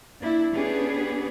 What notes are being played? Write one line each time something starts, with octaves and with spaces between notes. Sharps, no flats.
A#3 D4 E4 E5
B3 C#4 D4 G4 G#4 B4